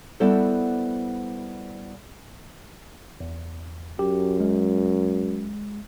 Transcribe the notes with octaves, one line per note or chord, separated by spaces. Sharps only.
G3 B3 E4 F#4 A4 C5
E2
F#2 G4
G#3